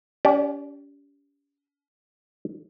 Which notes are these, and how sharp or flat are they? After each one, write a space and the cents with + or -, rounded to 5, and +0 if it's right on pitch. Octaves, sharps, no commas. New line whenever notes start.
C#4 +40 G4 +0 D5 +0